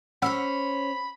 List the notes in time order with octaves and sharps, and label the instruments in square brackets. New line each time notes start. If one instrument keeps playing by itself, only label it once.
[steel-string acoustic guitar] C#4 C5 C#5 [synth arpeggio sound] F#5 E6 C#7 [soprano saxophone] B5